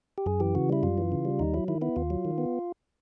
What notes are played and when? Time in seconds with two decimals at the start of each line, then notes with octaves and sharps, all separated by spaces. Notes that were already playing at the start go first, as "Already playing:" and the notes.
0.18 G4
0.26 F#2 G#4
0.40 E3 G4
0.55 C#3 F#4
0.69 G3 E4
0.83 F#2 F4
0.98 E3
1.12 C#3
1.25 G3
1.39 D#2 D#4
1.54 F#3 E4
1.68 D#3 E4
1.81 B3 E4
1.96 D#2 F4
2.10 F#3
2.25 D#3
2.38 B3